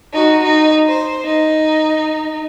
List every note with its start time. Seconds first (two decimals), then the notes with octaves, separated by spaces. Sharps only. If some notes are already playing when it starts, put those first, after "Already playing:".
0.13 D#4 F#4
0.43 D#4
0.88 C5
1.25 D#4